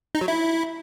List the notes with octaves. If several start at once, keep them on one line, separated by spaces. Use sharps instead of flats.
D#4
F#3
E4